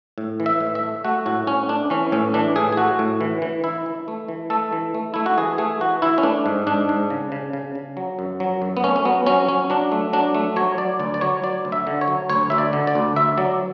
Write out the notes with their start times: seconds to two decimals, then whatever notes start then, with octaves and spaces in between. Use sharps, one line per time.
0.18 A2
0.40 E3
0.46 E5
0.61 A2
0.75 E5
0.83 A3
1.04 A3 F#4
1.26 A2 F#4
1.47 A2 C#4
1.69 A3 D4
1.90 E3 C#4
2.12 A2 C#4
2.34 E3 D4
2.56 A2 G#4
2.72 G#4
2.77 A3 F#4
2.99 A2
3.21 E3
3.42 E3
3.64 E3 E4
3.86 E3
4.08 A3
4.28 E3
4.50 A3 A4
4.73 E3
4.94 A3
5.14 A3 E4
5.26 F#4
5.37 E3 G#4
5.58 A3 G#4
5.81 E3 F#4
6.02 E3 E4
6.18 C#4
6.23 A3 D4
6.46 G#2
6.67 G#2 D4
6.89 G#2
7.10 C#3
7.32 C#3
7.53 C#3
7.75 C#3
7.97 F#3
8.19 F#2
8.40 F#3
8.62 F#2
8.77 B3
8.84 A3 C#4
8.96 C#4
9.05 F#3 B3
9.26 F#3 C#4
9.48 F#3 C#4
9.70 F#3 D4
9.92 A3
10.13 F#3 D4
10.35 A3
10.56 F#3 C#5
10.78 F#3 D5
11.00 D2 D5
11.14 D5
11.21 F#3 C#5
11.43 F#3 D5
11.65 D2
11.72 E5
11.87 D3
12.01 C#5
12.08 F#3
12.30 D2 C#5
12.50 D2 E5
12.58 D5
12.73 D3
12.87 D5
12.95 D2
13.16 D2 E5
13.38 F#3 D5